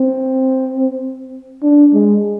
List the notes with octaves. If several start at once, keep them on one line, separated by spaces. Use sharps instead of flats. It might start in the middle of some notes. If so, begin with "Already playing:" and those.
Already playing: C4
D4
G#3